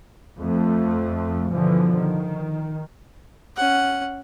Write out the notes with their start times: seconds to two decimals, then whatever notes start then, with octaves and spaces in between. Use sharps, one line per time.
0.39 F2 A3
1.50 G2 B2 D3 E3 F3
1.98 D#3
3.56 C#4 F#5